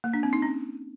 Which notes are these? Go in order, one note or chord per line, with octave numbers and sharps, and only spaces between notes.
A#3
D4
C4
D#4
C#4